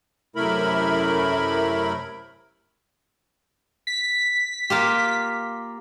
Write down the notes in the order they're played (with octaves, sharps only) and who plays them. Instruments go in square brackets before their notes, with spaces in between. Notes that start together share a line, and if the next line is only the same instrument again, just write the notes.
[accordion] F#2 C3 A3 E4 A#4 B5
[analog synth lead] B6
[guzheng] A#3 F4 G4